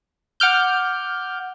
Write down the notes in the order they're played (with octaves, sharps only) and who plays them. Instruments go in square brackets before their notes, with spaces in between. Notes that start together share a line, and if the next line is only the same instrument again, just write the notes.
[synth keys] F#5 D6 F6 G6